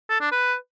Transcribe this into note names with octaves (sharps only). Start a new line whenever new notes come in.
A4
D4
B4